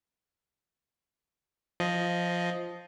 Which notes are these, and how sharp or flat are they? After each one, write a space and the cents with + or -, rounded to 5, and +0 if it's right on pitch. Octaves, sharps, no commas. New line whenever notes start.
F3 +0 D#5 +0